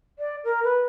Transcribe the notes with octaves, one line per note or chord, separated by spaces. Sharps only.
D5
A#4
B4